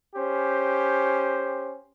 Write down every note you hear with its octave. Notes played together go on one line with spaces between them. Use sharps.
C#4 G4 C5